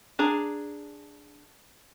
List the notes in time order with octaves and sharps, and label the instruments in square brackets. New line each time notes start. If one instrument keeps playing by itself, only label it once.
[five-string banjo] D4 G#4 A#5